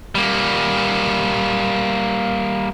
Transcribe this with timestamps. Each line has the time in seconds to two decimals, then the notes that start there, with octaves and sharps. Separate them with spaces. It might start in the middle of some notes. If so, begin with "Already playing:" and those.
0.15 G3 A#3